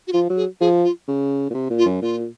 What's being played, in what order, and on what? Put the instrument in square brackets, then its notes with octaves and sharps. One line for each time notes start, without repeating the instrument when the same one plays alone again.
[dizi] F#4
[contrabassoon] F3 [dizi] F4
[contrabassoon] F#3
[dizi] G#4
[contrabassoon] F3 [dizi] G#4
[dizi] F4
[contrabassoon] C#3
A#2
C3
A#2
[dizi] F4
[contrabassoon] F#2
[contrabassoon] A#2 [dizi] F4